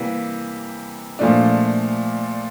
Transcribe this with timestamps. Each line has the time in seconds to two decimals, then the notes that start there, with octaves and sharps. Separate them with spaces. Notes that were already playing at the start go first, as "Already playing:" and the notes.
Already playing: C3 E3 G3 A#3
1.19 A#2 F3 A3 D4